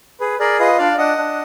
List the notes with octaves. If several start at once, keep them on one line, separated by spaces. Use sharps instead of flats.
G#4 B4
G#4 A#4 D5
F4 B4 D#5
D4 D5 F5
D4 D#5 F#5
D4